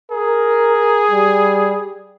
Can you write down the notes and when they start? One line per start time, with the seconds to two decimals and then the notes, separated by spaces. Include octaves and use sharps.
0.11 G#4 A#4
1.11 G3